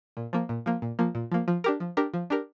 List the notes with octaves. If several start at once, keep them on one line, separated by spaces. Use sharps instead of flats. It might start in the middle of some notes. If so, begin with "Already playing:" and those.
A#2
F3 A#3
A#2
F3 A#3
A#2
F3 A#3
A#2
F3 A#3
F3
D4 G4 A#4
F3
D4 G4 A#4
F3
D4 G4 A#4